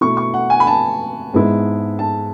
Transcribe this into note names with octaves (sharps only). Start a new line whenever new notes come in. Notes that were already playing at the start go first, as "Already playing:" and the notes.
B2 A3 E4 C#6
C#6
F#5
G#5
B5
A5
G#2 G#3 B3 E4
A5